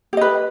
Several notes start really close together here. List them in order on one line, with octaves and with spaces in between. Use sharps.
G4 D#5 B4